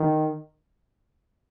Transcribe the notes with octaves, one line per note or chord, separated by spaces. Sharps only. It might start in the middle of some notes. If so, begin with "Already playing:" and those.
Already playing: D#3